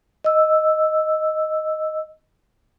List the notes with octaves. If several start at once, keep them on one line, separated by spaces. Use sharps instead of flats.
D#5 E6